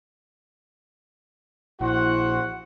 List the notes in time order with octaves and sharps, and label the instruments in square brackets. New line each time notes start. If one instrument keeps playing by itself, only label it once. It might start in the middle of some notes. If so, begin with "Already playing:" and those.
[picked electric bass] A#1 [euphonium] E4 [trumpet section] F#4 C5 F#5